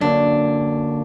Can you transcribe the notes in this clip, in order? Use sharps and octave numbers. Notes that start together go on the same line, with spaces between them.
F#2 D3 F#3 A#3 D4